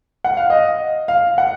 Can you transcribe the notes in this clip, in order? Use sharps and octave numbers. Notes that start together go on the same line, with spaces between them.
F#5
F5
D#5
F5
F#5